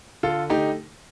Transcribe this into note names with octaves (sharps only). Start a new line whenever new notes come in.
D3 F4 A4
A3 D#4 G4